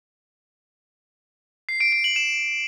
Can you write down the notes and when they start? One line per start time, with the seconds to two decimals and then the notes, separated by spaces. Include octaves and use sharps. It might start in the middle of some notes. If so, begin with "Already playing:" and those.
1.69 C7
1.80 D7
1.92 D7
2.04 F#7
2.16 E7